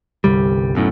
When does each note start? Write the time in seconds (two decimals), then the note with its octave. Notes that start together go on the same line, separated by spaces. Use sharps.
0.24 G1 C2 G3
0.75 B1 F#2 A2